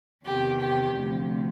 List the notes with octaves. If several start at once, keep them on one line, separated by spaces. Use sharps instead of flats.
E2 C3 D#3 G4
G4
D2 C3 F3